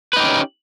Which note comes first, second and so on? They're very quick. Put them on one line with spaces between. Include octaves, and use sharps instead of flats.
B4 D#4 G4 C#4